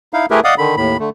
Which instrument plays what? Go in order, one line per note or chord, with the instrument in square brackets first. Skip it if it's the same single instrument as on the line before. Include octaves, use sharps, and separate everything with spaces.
[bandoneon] D#4 E4 F5
A3 E4 G4 G#4 A#4 B4
D5 D#5 F5 F#5 D#6
D3 D#3 B5
D#2 A2 B5
D3 A3